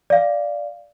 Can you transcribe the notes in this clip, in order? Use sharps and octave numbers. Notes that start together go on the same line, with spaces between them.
D5 F5